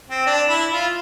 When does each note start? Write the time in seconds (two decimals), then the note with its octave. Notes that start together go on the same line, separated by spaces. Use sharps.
0.10 C4
0.26 D4
0.49 E4
0.72 F4